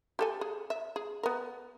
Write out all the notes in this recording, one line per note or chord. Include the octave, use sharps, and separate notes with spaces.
G4 A4 G#5
G#4
E5
G#4
B3 A#4